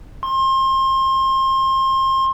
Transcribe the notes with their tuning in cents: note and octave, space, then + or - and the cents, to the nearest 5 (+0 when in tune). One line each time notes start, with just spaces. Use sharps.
C6 +30